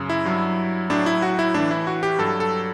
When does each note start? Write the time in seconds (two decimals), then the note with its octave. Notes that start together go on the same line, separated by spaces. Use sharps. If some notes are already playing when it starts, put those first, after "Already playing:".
Already playing: F#2 C#3
0.10 E4
0.25 G2 F#3
0.90 A2 F#3 D4
1.06 E4
1.22 F#4
1.39 E4
1.54 A2 E3 D4
1.71 E4
1.87 F#4
2.03 G4
2.19 G2 F#3 A4
2.40 A4